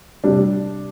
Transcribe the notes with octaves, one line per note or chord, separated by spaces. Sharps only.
C3 G3 D4